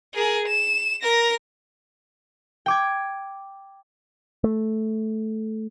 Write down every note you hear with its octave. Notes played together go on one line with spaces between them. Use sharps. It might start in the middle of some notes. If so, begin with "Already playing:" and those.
G#4 A#4
E7
A#4 A#6
G5 D6 G#6
A3